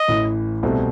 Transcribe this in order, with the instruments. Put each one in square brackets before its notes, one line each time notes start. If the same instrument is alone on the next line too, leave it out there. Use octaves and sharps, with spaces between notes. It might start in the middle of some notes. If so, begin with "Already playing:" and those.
Already playing: [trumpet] D#5
[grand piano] A1 A2 E3
C2 B2 A3 C4